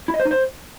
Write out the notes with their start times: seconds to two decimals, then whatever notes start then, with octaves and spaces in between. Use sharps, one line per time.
0.08 E4
0.14 D#5
0.20 C5
0.25 D#4
0.31 C5